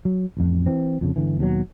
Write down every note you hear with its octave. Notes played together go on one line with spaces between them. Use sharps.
F#3
A1 F2
E3 C4
F2 A#2 C#3
G1 D3 E3
D#2 B2 D3 F#3